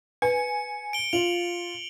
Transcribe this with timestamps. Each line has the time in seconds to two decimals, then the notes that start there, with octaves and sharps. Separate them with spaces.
0.22 B4 G#5 C#7
0.93 D7 G7
1.13 F4 F7 F#7